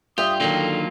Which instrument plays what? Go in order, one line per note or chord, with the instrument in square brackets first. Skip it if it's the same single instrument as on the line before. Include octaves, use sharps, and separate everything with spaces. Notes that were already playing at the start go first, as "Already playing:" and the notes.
[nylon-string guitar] G2 G4 E5 [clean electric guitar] F4 [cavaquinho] G5 [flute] D#6
[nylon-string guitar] D3 D#3 [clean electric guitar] F#3 A#3 F4 [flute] A4